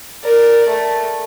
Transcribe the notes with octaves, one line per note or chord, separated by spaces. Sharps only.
A#4 D5
A3